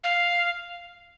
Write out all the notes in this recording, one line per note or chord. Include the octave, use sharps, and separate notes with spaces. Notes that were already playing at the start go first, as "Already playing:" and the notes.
F5